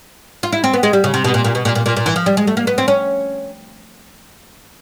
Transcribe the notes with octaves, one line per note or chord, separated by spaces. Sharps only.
F4
E4
C4
B3
G#3
G3
C#3
C3
B2
A#2
A#2
B2
A#2
A#2
A#2
A#2
E3
F3
G3
G#3
A3
A#3
B3
C4
C#4